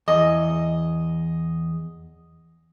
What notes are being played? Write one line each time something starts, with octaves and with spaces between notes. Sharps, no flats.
E2 D#5